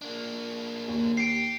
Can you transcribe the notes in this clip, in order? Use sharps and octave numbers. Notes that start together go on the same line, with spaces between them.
A#3 D4
D#2
G4 C7 D7